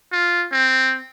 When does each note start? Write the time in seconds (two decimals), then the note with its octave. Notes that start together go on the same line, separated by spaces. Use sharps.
0.12 F4
0.52 C4